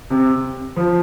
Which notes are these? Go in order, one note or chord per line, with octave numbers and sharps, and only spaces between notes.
C3
F3